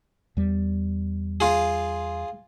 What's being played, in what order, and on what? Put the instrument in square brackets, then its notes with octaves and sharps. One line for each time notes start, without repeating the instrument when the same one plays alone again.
[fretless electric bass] E2 G3
[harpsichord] F4 G#4